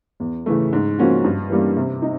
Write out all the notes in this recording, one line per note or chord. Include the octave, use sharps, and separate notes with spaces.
E2
C#3 E3 A3
G#2
F3 A#3 C#4 F#4
G2
E3 G3 A#3
C3
D#4